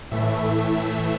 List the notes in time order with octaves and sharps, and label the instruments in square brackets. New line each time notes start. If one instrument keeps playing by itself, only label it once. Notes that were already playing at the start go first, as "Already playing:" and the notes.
[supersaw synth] A2 E3 A3 E5